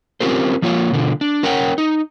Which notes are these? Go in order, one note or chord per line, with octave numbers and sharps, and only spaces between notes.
C4 C#4 F4 G4 A#4 C5
F3 A#3 F4 C#5
B2 D3 E3 F3
D4
C#4 A#4 C#5 F#5 G5
D#4